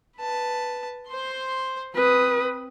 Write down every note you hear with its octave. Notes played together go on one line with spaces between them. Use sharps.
B4 A5
C5 C6
C4 B4 D#6